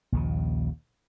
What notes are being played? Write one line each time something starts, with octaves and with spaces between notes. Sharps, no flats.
A#1 D#2 C#3